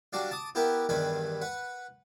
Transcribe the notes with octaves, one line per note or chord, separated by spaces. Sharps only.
G3 D4 F#4 D5 F5
A5 D6 D#6
B3 E4 G4 A#4 B4
E2 G2 D#3 B4 G#5 B5
B4 F#5